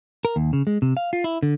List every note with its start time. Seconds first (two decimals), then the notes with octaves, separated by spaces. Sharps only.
0.25 A#4
0.36 D#2
0.53 C#3
0.67 G#3
0.82 C3
0.97 F5
1.13 F4
1.24 E4
1.43 D3